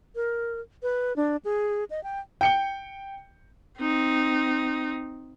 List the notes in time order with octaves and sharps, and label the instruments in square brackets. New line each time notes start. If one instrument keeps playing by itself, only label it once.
[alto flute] A#4
B4
D4
G#4
D#5
G5
[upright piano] G5 C#7 G7
[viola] C4 D#4